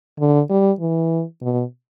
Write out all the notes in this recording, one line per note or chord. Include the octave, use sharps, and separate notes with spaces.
D3
G3
E3
B2